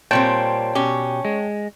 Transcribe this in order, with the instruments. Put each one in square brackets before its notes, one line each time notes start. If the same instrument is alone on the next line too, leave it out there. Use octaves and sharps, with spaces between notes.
[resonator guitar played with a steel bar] A#2 G3 C4 [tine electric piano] C#5 G5 A5
[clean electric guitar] B2 G4 [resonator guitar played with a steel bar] C#4
[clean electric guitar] G#3